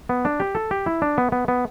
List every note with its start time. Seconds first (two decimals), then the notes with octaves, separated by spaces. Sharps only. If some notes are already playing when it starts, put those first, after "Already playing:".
0.09 B3
0.25 D4
0.40 G4
0.55 A4
0.71 G4
0.86 E4
1.02 D4
1.18 B3
1.32 B3
1.48 B3